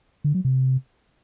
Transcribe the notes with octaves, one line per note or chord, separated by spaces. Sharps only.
D3
F#3
C3